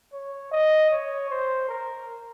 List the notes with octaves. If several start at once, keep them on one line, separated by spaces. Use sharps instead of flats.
C#5
D#5
C#5
C5
A#4